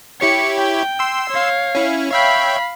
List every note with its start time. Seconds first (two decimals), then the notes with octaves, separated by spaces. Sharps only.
0.21 E4 G4 C#5 C#7
0.58 G5
0.99 C6 E6
1.30 C#5 F5
1.75 C#4 E4
2.11 C#5 E5 F5 G5 B5